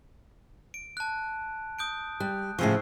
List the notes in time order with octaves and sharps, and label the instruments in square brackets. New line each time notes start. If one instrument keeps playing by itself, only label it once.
[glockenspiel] D7
A5 F#6
D#6 G6 D7
[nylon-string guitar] G3 [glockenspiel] F#6
[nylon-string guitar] A2 C#3 F3 [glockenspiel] C#6 E6 C7